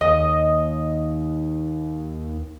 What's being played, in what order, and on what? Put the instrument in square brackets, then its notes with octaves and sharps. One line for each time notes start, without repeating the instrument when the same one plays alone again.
[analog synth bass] D#2 [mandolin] D#5